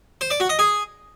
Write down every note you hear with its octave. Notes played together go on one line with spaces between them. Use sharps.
C5
D5
F#4
D#5
G#4